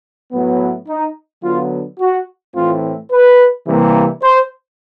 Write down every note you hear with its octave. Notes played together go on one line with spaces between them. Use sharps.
A2 F#3 B3
D#4
D3 F#3 B3 F4
F#4
A2 E3 A3 C4 F4
B4
C3 E3 G3 A#3
C5